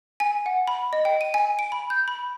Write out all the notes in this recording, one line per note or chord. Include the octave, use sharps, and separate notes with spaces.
G#5
F#5
B5
D#5
G5
D#7
G#5
D7
B5
G6
B5